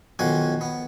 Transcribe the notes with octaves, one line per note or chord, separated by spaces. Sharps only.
B1 D#3 F3 F#5 G#5
B3